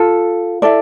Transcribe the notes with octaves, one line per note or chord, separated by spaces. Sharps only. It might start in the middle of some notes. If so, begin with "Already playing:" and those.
Already playing: F4 A4
E4 A4 D5